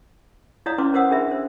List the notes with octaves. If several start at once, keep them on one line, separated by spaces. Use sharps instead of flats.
E4 C#5 D5 F5 A#5 D#6
C#4 E4 B4 C6 D6
A#4 C5 F5 F#5 D#6 E6
D4 G#4 A#4 E5 B5
C5